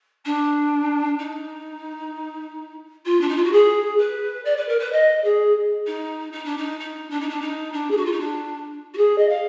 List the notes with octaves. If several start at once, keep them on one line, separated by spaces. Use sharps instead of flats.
D4
D#4
F4
D4
D#4
F4
F#4
G#4
B4
D5
B4
A#4
B4
D#5
G#4
D#4
D#4
D4
D#4
D#4
D4
D#4
D4
D#4
D4
G#4
F#4
F4
D#4
D4
F#4
G#4
D#5
F5